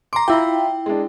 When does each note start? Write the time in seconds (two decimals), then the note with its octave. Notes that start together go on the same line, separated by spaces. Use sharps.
0.13 A#5 C6 D6 C7
0.28 E4 F4 E5 G5 B5
0.86 G#3 D4